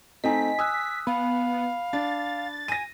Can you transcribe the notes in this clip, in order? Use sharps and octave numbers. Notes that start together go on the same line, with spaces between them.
A3 C4 D#4 D#5 G#5 B6
G#5 D#6 E6 F#6
B3 F5 B5
D4 A6
G#5 A#6 D#7